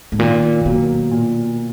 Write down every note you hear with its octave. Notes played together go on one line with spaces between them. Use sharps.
G#2
A#2 D#3
B2 F#3 A#3
A#2